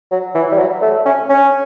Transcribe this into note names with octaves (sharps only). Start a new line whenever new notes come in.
F#3
E3
G3
F#3
A3
C#4
C#4